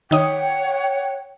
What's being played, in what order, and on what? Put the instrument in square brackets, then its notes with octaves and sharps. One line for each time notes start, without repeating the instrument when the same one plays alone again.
[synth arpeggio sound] D#3 D#4 D#6 [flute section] C#5 F#5 [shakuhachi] G5